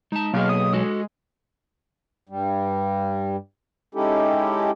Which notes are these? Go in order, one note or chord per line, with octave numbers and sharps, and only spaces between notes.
G#3 D#4 A5
B1 A#3 B3 G#4 F5
D#6
G#3 F#4 A4
G2 G3
G#3 C#4 D#4 E4 G4 A4